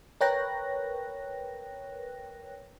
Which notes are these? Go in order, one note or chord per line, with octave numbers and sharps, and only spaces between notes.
A#4 B4 C#5 G5 F#6 A#6